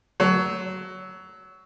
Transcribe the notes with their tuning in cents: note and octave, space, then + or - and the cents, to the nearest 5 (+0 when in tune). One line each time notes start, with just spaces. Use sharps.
F#3 +15